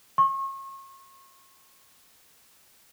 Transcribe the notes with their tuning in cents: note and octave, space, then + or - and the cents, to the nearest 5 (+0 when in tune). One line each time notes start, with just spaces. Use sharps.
C#6 -35